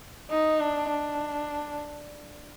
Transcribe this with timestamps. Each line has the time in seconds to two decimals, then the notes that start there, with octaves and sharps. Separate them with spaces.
0.31 D#4
0.60 D4
0.89 D4